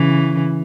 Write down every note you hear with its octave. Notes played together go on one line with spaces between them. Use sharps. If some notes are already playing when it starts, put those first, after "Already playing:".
Already playing: C#3 E3